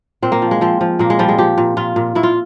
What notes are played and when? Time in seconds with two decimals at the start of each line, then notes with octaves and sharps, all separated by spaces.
0.22 A#2 C4
0.32 A#3
0.42 F3
0.51 G#3
0.61 F3 C4
0.81 F3
0.99 A#2 A#3
1.10 G#3
1.19 F3 G3
1.29 G#3
1.38 F3 G4
1.58 A#2
1.77 A#2 F4
1.96 A#2
2.15 A#2 E4
2.23 F4